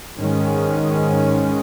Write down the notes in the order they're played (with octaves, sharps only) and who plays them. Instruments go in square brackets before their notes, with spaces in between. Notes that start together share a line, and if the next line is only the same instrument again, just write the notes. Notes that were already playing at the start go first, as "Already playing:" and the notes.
[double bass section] G#2 D#3 G#3 C#4